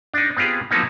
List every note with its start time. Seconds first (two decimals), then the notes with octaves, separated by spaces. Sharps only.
0.14 D4 D#4
0.37 B3 C4 F4 G4 G#4
0.71 F3 F#3 A#3 B3 C#4 D#4